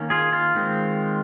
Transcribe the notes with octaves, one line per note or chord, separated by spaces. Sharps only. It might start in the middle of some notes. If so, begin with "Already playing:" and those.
Already playing: D#3 A#3 C#4
F4 G#4
F4
D#3 G#3 C4